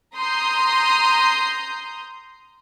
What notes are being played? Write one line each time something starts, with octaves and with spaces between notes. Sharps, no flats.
A#5 C6 D#6 G6